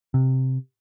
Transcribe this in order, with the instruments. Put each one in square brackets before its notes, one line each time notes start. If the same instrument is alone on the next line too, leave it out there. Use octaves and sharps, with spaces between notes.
[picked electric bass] C3